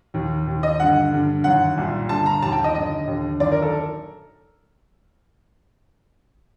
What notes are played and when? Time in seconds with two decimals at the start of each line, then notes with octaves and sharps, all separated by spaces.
0.14 D#2 D#3
0.47 D#2 D#3
0.63 D#5
0.80 G2 D3 F#5
1.12 G2 D3
1.44 F#2 D#3 F#5
1.77 C2 A#2
2.09 G2 D3 A5
2.26 A#5
2.42 D#2 A5
2.47 D#3
2.53 G5
2.64 D#5
2.75 F#2 D3 D#5
3.07 D#2 D3
3.40 F#2 D#3 D5
3.52 A#4
3.62 A4